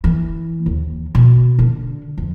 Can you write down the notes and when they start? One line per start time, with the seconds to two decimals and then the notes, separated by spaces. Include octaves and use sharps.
0.04 E3
0.66 D#2
1.15 B2
1.59 D3
2.18 F2